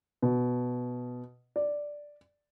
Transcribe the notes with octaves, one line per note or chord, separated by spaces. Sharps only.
B2
D5